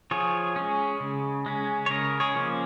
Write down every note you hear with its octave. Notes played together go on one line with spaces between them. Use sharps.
F3 G#4 C#5
G#3 C#4
C#3
G#3 C#4
C#5
C#3 A#4 D#5
G#4 C#5
F3 A#3 C#4